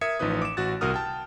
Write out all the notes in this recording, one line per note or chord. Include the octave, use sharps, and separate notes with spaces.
A#4 E5 D#6 G#6 C#7
A1 F3 D#4 B4 D#6
D6 E7
A1 F#4 F#6 A6
C2 F#4 A#4 D#6 F6
G5 A5